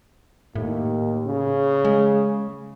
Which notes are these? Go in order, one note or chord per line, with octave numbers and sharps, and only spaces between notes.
D#2 A2
C#3
G#3